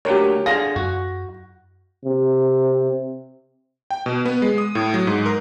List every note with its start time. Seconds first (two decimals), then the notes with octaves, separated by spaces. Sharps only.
0.05 D2 A#2 F#3 G4 A#4 C#5
0.46 D3 F4 G#4 F5 A#6
0.76 F#2 F#4
2.05 C3
3.90 G5
4.06 B2
4.25 B3
4.42 G#3
4.58 D#6
4.75 A2
4.94 F#3
5.07 G#2
5.26 A#4